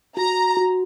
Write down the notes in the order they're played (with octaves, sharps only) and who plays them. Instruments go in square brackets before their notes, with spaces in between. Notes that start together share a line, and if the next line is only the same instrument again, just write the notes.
[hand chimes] F#4 [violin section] A#5
[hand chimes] F#4